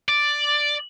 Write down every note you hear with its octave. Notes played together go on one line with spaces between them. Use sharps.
D5